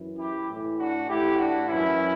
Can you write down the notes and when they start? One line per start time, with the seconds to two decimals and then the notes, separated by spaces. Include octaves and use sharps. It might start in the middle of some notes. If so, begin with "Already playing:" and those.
Already playing: F#2 E3
0.18 E4 G4
0.48 A2 E3
0.78 D4 F#4
1.07 A2 E3 E4 G4
1.37 D4 F#4
1.68 F#2 E3 C#4 E4